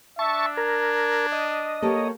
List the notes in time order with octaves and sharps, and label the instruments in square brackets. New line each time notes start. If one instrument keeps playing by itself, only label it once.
[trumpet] D4 [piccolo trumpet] E5 [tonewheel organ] A5 C#6
[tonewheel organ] A#4 [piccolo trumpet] G#6
[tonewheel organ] D#5
[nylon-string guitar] A#3 G4 A4 [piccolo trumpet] C#5